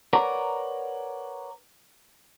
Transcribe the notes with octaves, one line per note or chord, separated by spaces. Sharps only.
A#4 B4 C#5 D5 F#5 A#5